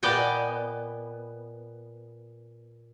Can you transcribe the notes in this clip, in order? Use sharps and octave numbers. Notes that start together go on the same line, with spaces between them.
A#2 B3 D5 D#5 G5 G#5